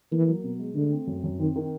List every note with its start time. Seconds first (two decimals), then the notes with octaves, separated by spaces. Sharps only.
0.11 E3 A#3
0.27 F#3
0.44 B2
0.59 G#3
0.75 D3 A3
0.91 C4
1.07 F#2
1.24 F#2
1.39 D#3 C4
1.56 D#3